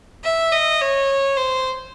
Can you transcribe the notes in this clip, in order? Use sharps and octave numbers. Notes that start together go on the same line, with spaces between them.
E5
D#5
C#5
C5